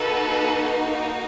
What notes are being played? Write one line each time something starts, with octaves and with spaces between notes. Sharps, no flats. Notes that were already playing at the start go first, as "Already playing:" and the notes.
Already playing: A#3 D#4 F#4 A4 B4